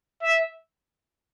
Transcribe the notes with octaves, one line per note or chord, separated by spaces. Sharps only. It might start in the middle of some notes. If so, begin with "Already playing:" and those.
E5